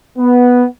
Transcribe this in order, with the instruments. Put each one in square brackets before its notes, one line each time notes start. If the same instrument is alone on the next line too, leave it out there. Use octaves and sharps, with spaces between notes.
[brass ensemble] B3